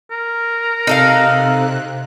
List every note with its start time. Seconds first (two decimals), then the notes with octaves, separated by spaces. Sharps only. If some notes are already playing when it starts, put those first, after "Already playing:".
0.11 A#4
0.87 C3 D#4 A4 F5 F#6